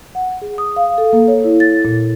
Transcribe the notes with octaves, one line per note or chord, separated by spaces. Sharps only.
F#5
G#4
D#6
F5
A4
A#3
C#5
E4
A6
A#2